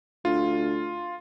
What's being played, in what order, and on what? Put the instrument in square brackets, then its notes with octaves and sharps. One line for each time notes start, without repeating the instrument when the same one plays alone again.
[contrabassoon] D2 [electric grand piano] F4